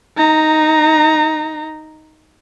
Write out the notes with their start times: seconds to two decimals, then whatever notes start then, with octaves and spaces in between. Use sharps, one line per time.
0.17 D#4 A#5